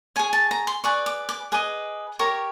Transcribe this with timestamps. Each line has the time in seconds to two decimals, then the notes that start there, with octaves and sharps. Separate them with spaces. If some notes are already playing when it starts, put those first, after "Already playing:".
0.16 G#4 C#5 G#5
0.33 A5
0.51 A#5
0.67 C6
0.84 G#4 B4 D5 C#6
1.06 D6
1.29 D6
1.52 G#4 B4 D#5 D6
2.19 G4 A#4 C#5 C#6